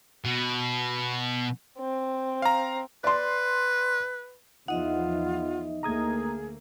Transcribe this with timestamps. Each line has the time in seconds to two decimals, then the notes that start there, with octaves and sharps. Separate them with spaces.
0.25 B2
1.78 C4
2.42 F5 A#5
3.04 B4 D5 C6
4.68 E2 F3 D#4 F4 D#5 E5 F#5
5.83 D2 A3 A#3 G#4 A#5 D#6 G#6